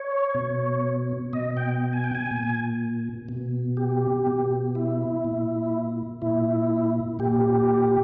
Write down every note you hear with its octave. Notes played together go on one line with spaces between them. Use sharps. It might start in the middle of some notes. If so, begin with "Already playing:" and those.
Already playing: C#5
B2
B2 D#5
G5
G#5
G5
G#5
A#2
B2
G4
B2
E4
A#2
A#2 E4
A#2 G4